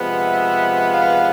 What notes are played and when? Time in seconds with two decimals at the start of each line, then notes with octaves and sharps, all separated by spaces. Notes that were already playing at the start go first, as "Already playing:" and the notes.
Already playing: C3 F3 G#3 B3
0.22 E5
0.92 F5